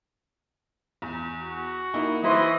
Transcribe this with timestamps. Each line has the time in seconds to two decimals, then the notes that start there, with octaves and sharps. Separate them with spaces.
1.02 E2
1.42 F#4
1.94 A#3 D#4 E4
2.24 E3 E4 C5 D#5 B5 C#6